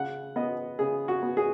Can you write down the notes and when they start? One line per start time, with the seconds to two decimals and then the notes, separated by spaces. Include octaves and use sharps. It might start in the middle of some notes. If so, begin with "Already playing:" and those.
Already playing: C#3 F#5
0.36 B3 D#5
0.79 C#3 G#4
1.08 F#4
1.22 B3
1.37 G#4